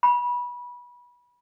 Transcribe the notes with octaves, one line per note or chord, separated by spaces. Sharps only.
B5